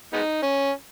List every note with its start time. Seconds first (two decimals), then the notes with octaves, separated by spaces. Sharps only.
0.13 G#3 B3 D#4
0.43 C#4